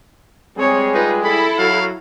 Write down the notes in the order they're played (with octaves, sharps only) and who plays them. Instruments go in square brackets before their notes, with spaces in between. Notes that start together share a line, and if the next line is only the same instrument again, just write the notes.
[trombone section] G3 G#3 G#4 [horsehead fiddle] C4 C#5
[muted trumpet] D#4 [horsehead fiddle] F4 B4
[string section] E4 [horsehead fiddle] A4 [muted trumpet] B5
[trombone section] F#3 F#4 [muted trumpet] F5